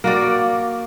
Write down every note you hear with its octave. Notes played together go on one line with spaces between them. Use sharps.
A#3 F#4 D5